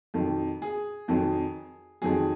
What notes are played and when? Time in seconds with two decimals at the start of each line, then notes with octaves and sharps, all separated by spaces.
0.14 F2 D#3 F#3
0.62 G#4
1.08 F2 D#3 F#3
2.02 F2 D#3 F#3 G#4